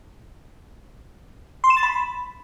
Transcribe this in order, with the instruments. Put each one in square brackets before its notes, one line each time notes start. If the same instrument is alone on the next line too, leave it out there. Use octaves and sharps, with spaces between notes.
[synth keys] C6
E7
A6
B5